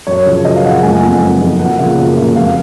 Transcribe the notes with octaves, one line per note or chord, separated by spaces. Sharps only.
F#2 C#5
C#3 F3
F#2 D#5
F5
C#3 F3 F#5
F#1 G#5
F#5
F2 F3 B3 D#4 G#5
F#1
F2 F3 B3 D#4
F#2 F#5
C#3 F3 A#3 F4
F#2
C#3 F3 A#3 F4
F1 F5